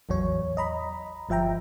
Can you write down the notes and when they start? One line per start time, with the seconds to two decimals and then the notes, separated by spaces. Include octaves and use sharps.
0.09 A1 E2 F#3 C#5
0.57 D#5 A#5 B5
1.29 G1 F3 E5 G5 A#5